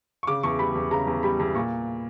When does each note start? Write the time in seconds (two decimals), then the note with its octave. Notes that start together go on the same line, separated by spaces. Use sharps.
0.23 C#6
0.27 C#3 D6
0.43 E2 C#6
0.59 G3 B5
0.75 E2
0.91 C#3 A#5
1.07 E2
1.23 G3 B5
1.39 E2
1.55 A#2 C#6